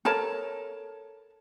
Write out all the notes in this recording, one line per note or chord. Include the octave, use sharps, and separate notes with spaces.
A4 A#4 C#5 A5